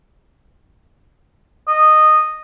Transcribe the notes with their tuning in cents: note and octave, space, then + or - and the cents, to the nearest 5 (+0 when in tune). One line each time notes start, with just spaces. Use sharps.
D#5 -10